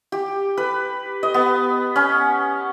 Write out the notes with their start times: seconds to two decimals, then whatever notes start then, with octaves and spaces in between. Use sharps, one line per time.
0.12 G4
0.57 B4
1.23 D#5
1.34 B3
1.96 C#4